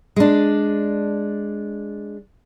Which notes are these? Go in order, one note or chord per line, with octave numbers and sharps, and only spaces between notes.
G#3 D4